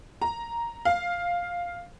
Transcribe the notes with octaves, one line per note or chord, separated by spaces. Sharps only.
A#5
F5